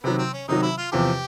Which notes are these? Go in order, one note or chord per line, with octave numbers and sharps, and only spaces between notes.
C3 D#3 F#3 B3
C4
C#4
C3 D#3 F#3 D#4
E4
F4
E2 C3 F3 G4